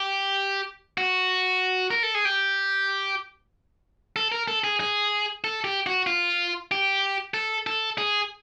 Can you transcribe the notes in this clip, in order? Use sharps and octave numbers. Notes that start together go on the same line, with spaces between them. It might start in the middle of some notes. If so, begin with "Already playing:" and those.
Already playing: G4
F#4
A#4
A4
G#4
G4
A4
A#4
A4
G#4
G#4
A4
G4
F#4
F4
G4
A4
A4
G#4